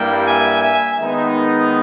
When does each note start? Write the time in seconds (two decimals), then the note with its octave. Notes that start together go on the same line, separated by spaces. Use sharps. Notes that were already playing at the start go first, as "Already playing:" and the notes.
Already playing: G2 G3 A#3 E4 G5
0.27 E5 G#5
0.63 E5 G#5
0.99 D#3 G#3 B3 D#4